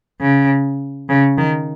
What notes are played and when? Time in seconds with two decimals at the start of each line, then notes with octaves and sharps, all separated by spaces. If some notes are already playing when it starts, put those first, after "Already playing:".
0.22 C#3
1.09 C#3
1.38 D#3